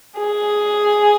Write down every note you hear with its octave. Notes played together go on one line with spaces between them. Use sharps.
G#4